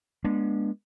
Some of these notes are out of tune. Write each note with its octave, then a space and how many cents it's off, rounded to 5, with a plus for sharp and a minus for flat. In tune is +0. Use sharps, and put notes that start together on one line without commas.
G#3 +0 B3 -40 D4 +0